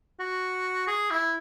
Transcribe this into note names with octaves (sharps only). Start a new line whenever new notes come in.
F#4
G#4
E4